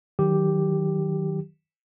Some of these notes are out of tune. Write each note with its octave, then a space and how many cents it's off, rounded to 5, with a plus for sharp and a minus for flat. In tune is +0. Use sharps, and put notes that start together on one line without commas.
D#3 +0 F#3 +0 G4 +0